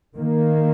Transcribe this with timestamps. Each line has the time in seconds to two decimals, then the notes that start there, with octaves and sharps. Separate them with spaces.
0.15 D#3 A#3